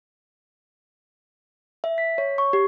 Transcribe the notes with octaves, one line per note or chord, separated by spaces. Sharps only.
E5
B6
C#5
C#6
G4